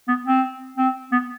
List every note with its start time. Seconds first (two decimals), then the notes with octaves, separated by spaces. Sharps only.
0.08 B3
0.26 C4
0.78 C4
1.12 B3